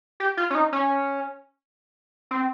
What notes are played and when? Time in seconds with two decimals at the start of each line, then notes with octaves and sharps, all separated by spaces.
0.20 G4
0.37 F4
0.50 C#4
0.55 D#4
0.73 C#4
2.31 C4